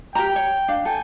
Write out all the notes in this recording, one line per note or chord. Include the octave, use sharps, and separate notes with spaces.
G4 A#4 G5 A#5
C#5
D4 F5
A4 G5 G#5